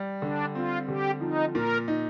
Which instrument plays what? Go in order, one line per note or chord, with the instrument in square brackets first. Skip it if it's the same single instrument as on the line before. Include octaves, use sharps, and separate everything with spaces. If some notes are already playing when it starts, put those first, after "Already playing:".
Already playing: [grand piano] G3
[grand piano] D3 [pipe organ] D4
[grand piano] C4 [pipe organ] F4
[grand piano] D3 [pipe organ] G4
[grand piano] F3 [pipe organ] D#4
[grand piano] A#2 [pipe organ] A#4
[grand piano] D#4